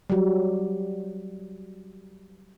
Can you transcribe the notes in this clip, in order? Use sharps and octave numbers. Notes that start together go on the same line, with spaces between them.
F#3 G3